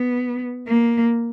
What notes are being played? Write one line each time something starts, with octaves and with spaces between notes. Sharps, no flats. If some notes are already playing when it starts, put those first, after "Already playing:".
Already playing: B3
A#3